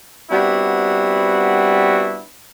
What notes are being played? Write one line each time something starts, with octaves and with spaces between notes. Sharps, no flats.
G3 B3 C4 D4 E4 F#4